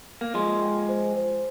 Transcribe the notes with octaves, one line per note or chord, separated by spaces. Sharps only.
A#3
F3 G#3 C6
G5
C5
C5